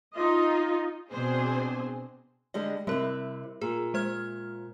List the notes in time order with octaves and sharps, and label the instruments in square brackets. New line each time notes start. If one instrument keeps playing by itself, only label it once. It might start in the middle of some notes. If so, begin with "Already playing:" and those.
[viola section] D#4 F4 D#5
[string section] B2 C4 D4 G#4 C5
[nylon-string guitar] D3 G3 G#3 [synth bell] D5
[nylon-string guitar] C3 E4 [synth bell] G3 A#4
[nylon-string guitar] A#2 [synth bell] G#4
[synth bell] G#3 C5 F6